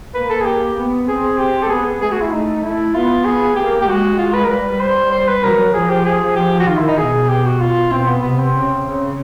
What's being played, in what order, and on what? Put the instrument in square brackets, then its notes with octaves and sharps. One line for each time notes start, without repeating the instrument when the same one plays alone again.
[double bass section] A#3 [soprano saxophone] B4
[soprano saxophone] A4
G#4
G4
[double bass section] B3
[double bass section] C4 [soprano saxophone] G#4
[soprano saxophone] G4
A4
[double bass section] B3 [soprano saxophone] G#4
[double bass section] A3 [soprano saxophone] G#4
[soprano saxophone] F#4
E4
[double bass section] A3 [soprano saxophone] D#4
[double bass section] A3 [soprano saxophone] E4
[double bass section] B3 [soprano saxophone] F4
[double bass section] B3 [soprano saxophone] G#4
[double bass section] A#3 [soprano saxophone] G4
[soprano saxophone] G4
[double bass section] G#3 [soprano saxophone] F#4
[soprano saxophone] F4
B4
A#4
[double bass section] G3 [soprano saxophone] B4
[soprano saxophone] C5
C5
B4
[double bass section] F#3 [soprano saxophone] A#4
[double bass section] F3 [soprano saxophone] G#4
[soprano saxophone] G4
G#4
G4
F#4
[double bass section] D#3 [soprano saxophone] F4
[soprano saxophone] E4
D#4
[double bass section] B2 [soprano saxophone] G#4
[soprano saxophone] G4
F#4
F4
[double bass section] B2 [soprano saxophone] C4
[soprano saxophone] B3
[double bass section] C3 [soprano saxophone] B3
[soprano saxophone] C4
[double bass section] C#3
C#3